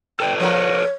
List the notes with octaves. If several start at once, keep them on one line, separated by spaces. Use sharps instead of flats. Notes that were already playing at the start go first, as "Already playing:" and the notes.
A4 B4 D5 G5
F3 F#4 A#4 C#5